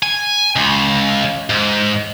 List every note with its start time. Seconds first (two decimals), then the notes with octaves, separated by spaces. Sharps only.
0.03 G#5
0.56 C#2
1.50 G#2